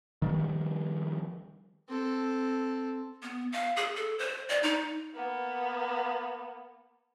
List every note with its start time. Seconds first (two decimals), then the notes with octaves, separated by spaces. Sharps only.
0.22 D#3 F3 G3
1.88 C4 A4
3.23 B3
3.52 F5
3.76 G#4
3.96 A4
4.19 C5
4.49 D5
4.63 D#4
5.14 A#3 B3